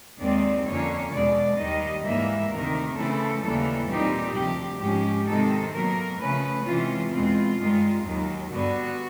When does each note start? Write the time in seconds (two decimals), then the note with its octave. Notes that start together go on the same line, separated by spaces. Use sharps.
0.19 D#2 D#3 G#3 C4 D5
0.65 F2 D3 F3 A#3 C#4 C#5
1.12 E2 B2 G#3 D5
1.57 D#2 D#3 G3 D#5
2.04 G#2 E3 G3 A#3 E5
2.50 D2 C3 D#3 A#4
2.95 C#3 E3 A3 C4 E4 A4
3.42 D#2 C#3 E3 G3 A#3 A4
3.88 A#2 G3 C4 D#4 G4
4.34 D2 C3 F3 G4
4.80 G#2 F3 G#3 C#4 G4
5.26 C3 D#3 G#3 C4 D#4 A4
5.73 B2 F#3 A#3 A#4
6.19 C#3 F3 A3 C#4 B4
6.65 C3 E3 G#3 C#4 F4
7.11 E2 B2 G#3 C4 F4
7.57 G2 D#3 G#3
8.03 D#2 D#3 F#3
8.49 G2 D3 G3 B3 F#4